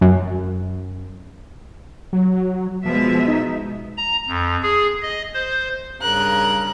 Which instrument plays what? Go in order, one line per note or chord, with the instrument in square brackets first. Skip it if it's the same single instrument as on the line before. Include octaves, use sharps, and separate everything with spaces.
[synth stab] F#2
[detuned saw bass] F#3
[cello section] B2 G#3 E5 [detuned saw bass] F3
[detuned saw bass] D#4
[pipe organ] A#5
F2
G#4
D#5
C5
[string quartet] G2 C#3 A#4 F#6